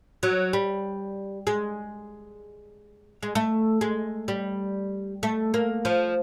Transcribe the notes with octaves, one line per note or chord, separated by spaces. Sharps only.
F#3
G3
G#3
G#3
A3
G#3
G3
A3
A#3
F3